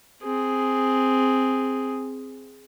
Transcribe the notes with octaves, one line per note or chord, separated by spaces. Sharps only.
C4 G#4